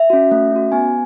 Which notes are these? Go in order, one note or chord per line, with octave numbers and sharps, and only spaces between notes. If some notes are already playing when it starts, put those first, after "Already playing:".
Already playing: E5
C#4 F#4
A3
C#4 F#4
B3 G#5